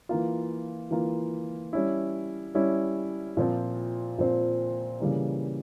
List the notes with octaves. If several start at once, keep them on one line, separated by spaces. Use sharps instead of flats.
E3 A#3 F4
E3 A#3 F4
G3 C#4 E4
G3 C#4 E4
A#2 F3 C4
A#2 F3 C4
C#3 E3 G3 A#3